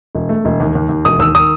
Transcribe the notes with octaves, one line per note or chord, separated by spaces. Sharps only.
E1
A3
E1
D#2
D#2
D#2
E1 D#6
D#2 E6
D#3 D#6